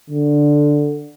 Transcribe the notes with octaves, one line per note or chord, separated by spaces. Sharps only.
D3